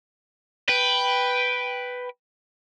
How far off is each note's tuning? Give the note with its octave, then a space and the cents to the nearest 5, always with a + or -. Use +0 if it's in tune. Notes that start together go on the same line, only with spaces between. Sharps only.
B4 +0 G5 +0